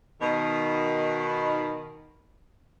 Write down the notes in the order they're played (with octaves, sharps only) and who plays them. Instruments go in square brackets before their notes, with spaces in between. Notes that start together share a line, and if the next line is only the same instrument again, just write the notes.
[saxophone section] B2 D#3